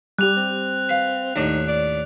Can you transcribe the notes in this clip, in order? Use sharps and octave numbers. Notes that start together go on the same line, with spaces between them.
G3 G4 F#6 F7
C4
B4 F5
D#2 A2 D4 D#4
D5